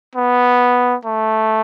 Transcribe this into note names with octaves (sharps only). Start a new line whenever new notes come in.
B3
A3